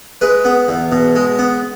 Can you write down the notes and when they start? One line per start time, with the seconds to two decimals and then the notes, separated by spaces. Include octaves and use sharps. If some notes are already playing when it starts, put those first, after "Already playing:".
0.21 G#3 B4
0.45 B3
0.68 E2
0.92 B2
1.16 G#3
1.39 B3